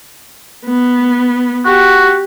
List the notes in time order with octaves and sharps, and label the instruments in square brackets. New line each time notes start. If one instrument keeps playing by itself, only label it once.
[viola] B3
[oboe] F#4 [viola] G4